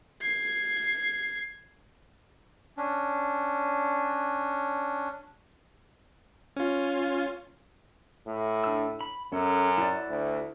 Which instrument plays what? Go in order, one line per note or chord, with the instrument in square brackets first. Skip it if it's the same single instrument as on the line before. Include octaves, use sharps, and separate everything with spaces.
[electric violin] G#6 C7
[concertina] C#4 D4
[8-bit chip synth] C#4 F4
[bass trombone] A2
[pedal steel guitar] D4 E6
B5
[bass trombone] F#2 [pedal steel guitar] C#4 A4
[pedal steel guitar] E4 F#4 D5
[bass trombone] D2